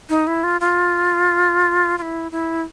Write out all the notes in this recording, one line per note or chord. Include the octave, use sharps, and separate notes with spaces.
D#4
E4
F4
F4
F4
E4
E4